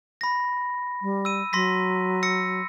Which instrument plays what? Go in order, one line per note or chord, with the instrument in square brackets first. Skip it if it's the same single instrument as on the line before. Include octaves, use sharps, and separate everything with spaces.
[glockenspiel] B5 A#6
[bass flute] G3
[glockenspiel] E6 D#7
[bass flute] F#3 [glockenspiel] C6 A#6 B6
[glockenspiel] E6 A#6 C#7